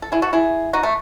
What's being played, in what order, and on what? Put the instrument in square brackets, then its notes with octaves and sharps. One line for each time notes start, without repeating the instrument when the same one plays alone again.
[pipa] A4
E4 G#4
F#4 A4
E4 G#4
D#4 F#4
A3